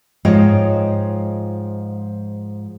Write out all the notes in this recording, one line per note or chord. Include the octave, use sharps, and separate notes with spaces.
G#2 F3 F4 C#5 D#5 G5